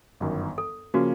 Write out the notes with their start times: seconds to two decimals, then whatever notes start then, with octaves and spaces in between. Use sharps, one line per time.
0.20 G1 F#2 D#3
0.58 A4
0.94 C#3 F3 A#3 C#4 F#4